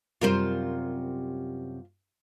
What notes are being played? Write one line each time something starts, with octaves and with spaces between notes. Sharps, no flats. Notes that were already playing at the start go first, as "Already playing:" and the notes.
F#2 C3 G3 F4 A#4 C5